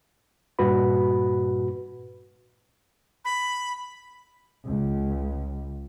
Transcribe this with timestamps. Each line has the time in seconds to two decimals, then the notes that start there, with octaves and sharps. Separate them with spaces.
0.59 G2 A#2 F#4 B4 B5
3.25 B5
4.65 C#2